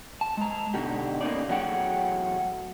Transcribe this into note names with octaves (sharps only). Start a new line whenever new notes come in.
A5
G#3 A#5
B2 D3 D#4 G4
A#3 B3 C#4 D#4 D5
E2 F#3 A3 G#4 F#5 G5